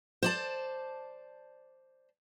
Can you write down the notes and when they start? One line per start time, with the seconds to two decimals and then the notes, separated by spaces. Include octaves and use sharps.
0.23 C5 D5 A5